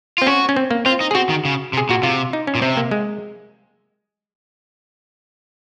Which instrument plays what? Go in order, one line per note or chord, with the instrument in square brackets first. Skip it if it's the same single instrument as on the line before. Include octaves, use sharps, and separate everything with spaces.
[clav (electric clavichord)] C4 [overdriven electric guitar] F4
[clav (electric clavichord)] C#4 [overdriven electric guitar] F#4
[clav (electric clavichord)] C#4
C4
A#3
[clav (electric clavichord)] C4 [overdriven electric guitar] F4
[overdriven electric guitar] D#4
[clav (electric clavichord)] G#4
[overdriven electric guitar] C4 [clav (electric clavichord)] F#4
[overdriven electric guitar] D#3
C#3
C3
[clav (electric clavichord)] G#4
[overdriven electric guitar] A#2 [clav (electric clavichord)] F#4
[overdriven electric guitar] C3 [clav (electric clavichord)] F4
[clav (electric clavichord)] D#4
C#4
[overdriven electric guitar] A#2
[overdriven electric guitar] C3 [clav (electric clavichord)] C4
[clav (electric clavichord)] A#3
G#3